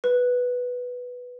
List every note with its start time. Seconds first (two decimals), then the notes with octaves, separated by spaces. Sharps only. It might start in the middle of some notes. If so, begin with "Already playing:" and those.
0.04 B4